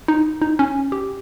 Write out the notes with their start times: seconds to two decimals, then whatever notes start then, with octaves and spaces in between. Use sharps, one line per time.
0.08 D#4
0.42 D#4
0.59 C#4
0.92 G4